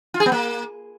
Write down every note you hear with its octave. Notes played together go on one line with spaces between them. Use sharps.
F4
G#4
B3
A#3